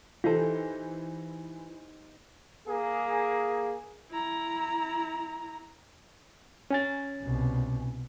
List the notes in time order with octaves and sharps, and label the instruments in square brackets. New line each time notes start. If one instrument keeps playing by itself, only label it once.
[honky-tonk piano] E3 [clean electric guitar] D#4 G4 C5 [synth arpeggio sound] F4 A4
[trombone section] A#3 G#4
[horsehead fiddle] E4 A#5
[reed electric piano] C#4 G#5 A6
[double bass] C2 B2